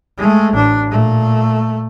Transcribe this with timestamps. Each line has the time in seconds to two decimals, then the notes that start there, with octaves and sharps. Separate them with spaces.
0.18 G#3 A3
0.53 A1 D4
0.89 A#2 A3